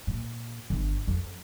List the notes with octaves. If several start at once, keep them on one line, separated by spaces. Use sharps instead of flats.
A#2
G1
F2